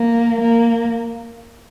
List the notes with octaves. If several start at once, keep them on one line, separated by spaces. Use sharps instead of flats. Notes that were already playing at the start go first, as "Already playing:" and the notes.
Already playing: A#3
A#3